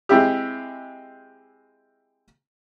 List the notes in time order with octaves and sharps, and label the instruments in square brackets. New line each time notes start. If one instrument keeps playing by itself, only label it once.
[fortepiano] G#3 C4 E4 G4